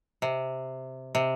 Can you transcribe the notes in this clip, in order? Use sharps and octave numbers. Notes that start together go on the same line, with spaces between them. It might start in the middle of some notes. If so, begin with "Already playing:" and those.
C3
C3